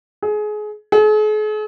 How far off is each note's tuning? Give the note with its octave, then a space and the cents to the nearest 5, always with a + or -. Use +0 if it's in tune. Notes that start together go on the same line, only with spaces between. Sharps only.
G#4 +25
G#4 +45